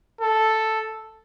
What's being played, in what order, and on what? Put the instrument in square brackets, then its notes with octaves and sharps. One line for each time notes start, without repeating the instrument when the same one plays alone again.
[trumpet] A4